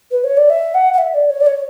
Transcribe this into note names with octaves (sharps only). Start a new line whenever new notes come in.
B4
C#5
D5
E5
F#5
F#5
E5
D5
C#5
D5
C#5